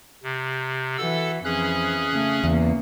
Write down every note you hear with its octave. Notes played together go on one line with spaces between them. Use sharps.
C3
E3 F#4 A4 E6
F2 E3 C#4 G#4 F#6
C#3 A3
E2 C#3 A#3